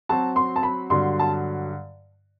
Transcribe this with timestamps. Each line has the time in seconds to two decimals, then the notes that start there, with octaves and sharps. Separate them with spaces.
0.09 F#3 C4 F#4 A5
0.36 C6
0.56 A5
0.63 B5
0.90 G2 D3 F#3 C6
1.19 A5